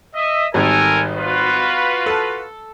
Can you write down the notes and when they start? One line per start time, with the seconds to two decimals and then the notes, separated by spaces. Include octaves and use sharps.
0.15 D#5 E5
0.54 G#1 D#3 G3 A4 A#4 G#5
1.17 F4 F#4 B4
2.06 A4 A5